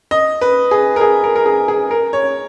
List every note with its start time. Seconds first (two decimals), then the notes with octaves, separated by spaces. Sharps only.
0.11 D#5
0.41 B4
0.71 G#4
0.96 A#4
1.01 G#4
1.24 A#4
1.36 A#4
1.46 G#4
1.68 G#4
1.91 A#4
2.13 C#5